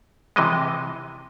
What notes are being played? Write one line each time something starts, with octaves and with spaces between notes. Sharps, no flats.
C3 E3 G#3 D#5